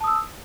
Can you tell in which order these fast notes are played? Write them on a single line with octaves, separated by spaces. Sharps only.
A5 D#6 E6